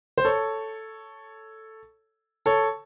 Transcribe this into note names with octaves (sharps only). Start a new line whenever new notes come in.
C5
A4 C#5
A4 C#5